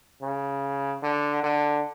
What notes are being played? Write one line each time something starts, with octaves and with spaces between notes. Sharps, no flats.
C#3
D3
D3